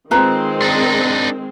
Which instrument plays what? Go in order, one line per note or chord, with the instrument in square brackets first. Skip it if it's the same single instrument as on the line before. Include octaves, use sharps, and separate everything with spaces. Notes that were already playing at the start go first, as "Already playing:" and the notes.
[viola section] D#3 G#3 C4 [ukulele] F4 B4 A#5
[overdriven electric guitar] D4 D#4